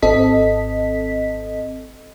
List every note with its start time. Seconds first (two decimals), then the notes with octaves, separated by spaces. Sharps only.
0.02 G#1 C4 A4 D#5 B6